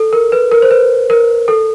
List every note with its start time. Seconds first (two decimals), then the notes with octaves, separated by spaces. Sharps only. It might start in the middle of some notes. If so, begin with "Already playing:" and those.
Already playing: A4
0.13 A#4
0.32 B4
0.52 A#4
0.62 C5
0.71 B4
1.10 A#4
1.48 A4